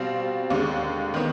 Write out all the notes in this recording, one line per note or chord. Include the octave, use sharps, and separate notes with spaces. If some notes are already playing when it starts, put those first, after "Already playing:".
Already playing: B2 G3 C4 F5
D#2 D3 G#3 F5
D#3 B3